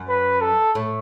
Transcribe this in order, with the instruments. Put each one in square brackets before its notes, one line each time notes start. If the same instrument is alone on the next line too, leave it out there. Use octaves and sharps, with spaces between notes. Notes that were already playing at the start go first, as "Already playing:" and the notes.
Already playing: [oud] F#2
[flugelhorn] B4
A4
[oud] A2